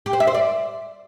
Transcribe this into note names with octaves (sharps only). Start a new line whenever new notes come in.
G4
C5
E5
C5
D5